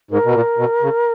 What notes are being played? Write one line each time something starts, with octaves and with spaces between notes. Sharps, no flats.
G#2 A#4
B2
A#2
B2
C#3